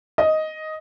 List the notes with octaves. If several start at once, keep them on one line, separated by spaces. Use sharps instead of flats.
D#5